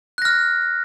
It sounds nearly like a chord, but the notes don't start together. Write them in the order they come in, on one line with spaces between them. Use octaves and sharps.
F#6 A#6 F6